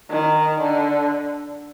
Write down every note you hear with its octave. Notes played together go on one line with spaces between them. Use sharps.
D#3
D3